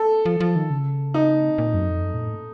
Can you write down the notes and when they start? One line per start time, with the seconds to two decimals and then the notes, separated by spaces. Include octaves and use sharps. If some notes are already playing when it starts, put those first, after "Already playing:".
Already playing: A4
0.26 F3
0.40 F3
0.56 D#3
0.70 C#3
1.14 D#4
1.58 A#2
1.74 F#2
1.88 F2
2.04 F#2
2.14 A#2
2.25 A2